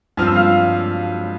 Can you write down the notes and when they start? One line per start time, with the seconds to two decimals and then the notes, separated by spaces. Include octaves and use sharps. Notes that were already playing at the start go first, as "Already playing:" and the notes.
0.17 G2 F3 C4 F6
0.27 E6
0.36 F5 F6